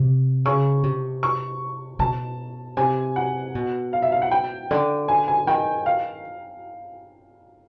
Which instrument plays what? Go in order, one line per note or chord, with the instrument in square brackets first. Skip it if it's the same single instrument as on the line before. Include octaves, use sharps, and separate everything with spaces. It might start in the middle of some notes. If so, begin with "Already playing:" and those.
Already playing: [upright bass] C3
[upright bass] C#3 [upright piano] C#6
[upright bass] C3
[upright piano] C#6
[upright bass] B2 [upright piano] A5
[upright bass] C3 [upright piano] G#5
[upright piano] F#5
[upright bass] B2
[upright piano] F5
E5
F5
F#5
G5
[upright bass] D3
[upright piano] G#5
G#5
[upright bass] D#3 [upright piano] G5
[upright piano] F5